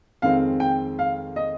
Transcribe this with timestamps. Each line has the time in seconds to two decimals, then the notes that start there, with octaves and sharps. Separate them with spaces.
0.22 F2 D#3 G#3 C4 F5
0.60 G5
0.99 F5
1.36 D#5